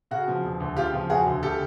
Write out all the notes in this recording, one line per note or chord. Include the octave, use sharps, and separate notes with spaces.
C#3 F#4
F3
E1
D2
C#3 F4 G4
F3
E1 F#4 G#4
D2
C#3 G4 A4